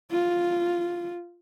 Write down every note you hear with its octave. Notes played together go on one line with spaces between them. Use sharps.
F4